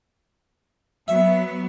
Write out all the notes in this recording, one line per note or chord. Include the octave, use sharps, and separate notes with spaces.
F#3 B3 E5